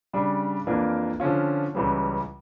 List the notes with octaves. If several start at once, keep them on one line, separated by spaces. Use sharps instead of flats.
C#3 G3 D4
F2 E3 A#3 D4 F4
D3 F3 C#4 F4
C#2 C#3 E3 G3 C#4